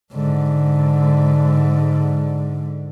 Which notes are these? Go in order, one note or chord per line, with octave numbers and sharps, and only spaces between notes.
G#2 D3